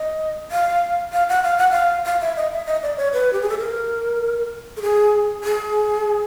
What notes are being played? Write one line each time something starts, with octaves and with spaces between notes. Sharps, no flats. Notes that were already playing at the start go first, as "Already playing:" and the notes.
Already playing: D#5
F5
F5
F#5
F5
F#5
F5
F5
E5
D#5
E5
D#5
D5
C#5
B4
G4
G#4
A4
A#4
A4
G#4
G#4